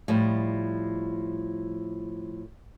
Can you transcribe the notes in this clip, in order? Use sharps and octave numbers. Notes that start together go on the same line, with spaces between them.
A2 F3 G3